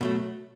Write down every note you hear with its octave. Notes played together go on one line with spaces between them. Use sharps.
B2 F#3 A3